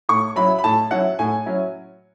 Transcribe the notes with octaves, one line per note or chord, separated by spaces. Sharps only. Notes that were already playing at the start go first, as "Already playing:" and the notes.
A2 C#6
F#3 C#4 E4 B5
B5
A2 A5
F#3 C#4 E4 F#5
A2 G#5
F#3 C#4 E4